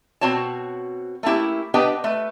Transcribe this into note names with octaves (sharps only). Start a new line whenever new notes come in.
B2 C4 F#4 C#5 A5
A3 A#3 C#4 E4 G4
B3 D4 G4 B4 D#5 G5
A3 B4